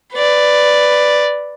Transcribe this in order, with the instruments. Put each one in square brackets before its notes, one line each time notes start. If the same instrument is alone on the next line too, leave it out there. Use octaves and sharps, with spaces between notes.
[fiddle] B4 D5